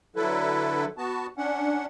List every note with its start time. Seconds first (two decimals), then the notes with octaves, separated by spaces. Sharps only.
0.16 D3 F#3 E4 A4 B4
0.98 B3 F#4 A5
1.38 C#4 D4 F#5